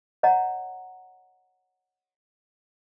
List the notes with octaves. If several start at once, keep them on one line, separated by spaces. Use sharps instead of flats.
C#5 D#5 F#5 A#5